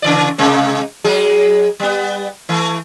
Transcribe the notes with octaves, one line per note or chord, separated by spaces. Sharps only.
C#3 E3 D5
C3 G#3 A#3
F#3 G#3 G#4
G3 B3
E3 A3